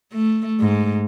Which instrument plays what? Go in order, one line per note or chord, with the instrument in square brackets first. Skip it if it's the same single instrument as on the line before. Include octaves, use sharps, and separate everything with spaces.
[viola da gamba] A3
G#2